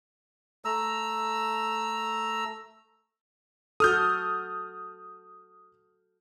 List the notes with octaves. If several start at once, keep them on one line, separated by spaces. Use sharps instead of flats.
A3 A#5 E6
F#4 A4 D#6 F6 G6